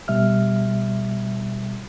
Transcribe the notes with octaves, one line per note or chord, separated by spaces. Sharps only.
B2 G3 E5 F6